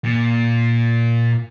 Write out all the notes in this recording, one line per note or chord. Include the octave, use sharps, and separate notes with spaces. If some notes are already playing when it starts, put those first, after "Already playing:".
A#2